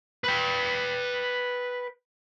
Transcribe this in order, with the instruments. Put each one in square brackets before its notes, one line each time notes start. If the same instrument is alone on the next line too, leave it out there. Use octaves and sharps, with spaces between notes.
[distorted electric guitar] B4 G5